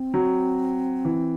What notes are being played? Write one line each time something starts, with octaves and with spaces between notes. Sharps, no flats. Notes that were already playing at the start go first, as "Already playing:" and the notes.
Already playing: C4
F#3
E3